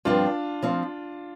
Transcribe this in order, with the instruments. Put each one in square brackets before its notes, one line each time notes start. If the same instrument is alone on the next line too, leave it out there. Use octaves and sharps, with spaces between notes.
[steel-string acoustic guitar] G2 F3 C4 [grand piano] D4 F4
[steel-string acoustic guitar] F3 C4